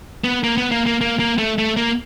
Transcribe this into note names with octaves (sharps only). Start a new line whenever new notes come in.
B3
A#3
B3
A#3
A#3
A#3
A#3
A3
A3
A#3